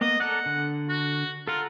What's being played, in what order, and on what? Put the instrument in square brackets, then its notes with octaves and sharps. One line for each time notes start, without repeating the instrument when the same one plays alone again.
[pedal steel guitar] A#3 B3 [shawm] D#5
[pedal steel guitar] A4 A#4 D5 [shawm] F#5
[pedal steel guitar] D3
[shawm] F#4
[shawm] F4 [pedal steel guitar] A4 F#5 A#5